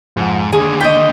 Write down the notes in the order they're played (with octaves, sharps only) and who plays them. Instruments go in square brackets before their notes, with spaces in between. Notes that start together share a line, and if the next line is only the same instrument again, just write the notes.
[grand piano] F2 F#5 [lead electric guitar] G#2
[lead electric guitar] D#2 D3 [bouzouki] G#4 [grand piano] G#5
[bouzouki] D#5 G5 [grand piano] C#6 G6 B6